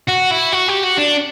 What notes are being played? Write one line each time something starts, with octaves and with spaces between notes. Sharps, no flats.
F#4
E4
F#4
G4
F#4
D4